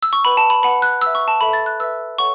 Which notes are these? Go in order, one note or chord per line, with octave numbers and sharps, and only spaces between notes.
E6
C#6
B4 F#5 B5
A5
B5
B4 F#5 B5
F#6
B4 E5 E6
C#6
A5
A4 E5 B5
A6
F#6
B4 E5 E6
A4 C#5 F#5 C#6